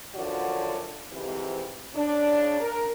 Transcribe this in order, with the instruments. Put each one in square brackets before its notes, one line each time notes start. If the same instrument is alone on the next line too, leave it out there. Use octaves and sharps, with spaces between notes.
[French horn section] F#2 D3 F3 F#4 C#5 D5
F2 G#2 C3 E3
C#3 D4
A#4